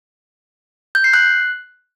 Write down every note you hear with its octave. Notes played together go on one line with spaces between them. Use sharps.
G6
C7
F#6